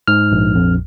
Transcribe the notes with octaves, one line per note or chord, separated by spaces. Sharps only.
G#2 F6
A#1
F2